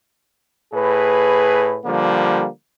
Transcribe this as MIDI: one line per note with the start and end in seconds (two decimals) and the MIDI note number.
0.74 1.79 45
0.74 1.79 68
0.74 1.79 71
1.86 2.46 50
1.86 2.46 53
1.86 2.46 55
1.86 2.46 58